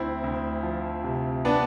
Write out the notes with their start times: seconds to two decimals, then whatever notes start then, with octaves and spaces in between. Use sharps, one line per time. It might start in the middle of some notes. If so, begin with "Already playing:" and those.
Already playing: D2 C4 E4
0.24 D2
0.63 F3
1.04 C3
1.45 B3 D4